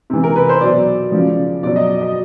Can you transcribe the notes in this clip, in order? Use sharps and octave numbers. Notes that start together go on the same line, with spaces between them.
C3 E3
A#4
B4
C5
B2 F#3 D5
C#3 F3
B2 F#3 D5
D#5
D#5